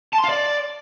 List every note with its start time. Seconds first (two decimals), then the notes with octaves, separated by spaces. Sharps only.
0.13 A5
0.18 C6
0.24 F5
0.29 D5